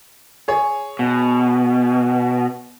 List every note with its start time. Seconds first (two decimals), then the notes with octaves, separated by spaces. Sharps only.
0.48 G#4 C#5
0.99 B2